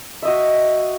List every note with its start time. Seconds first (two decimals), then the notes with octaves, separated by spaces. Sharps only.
0.22 E5
0.25 D#5
0.28 F#4